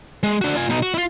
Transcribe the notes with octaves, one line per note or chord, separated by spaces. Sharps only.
G#3
D4 F#4
F4 G#5
B2 D#4
F#4
E4 F4